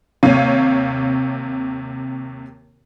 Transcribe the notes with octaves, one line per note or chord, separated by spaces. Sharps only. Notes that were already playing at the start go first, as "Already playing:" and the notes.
D#2 C3 C#5 F5 D#7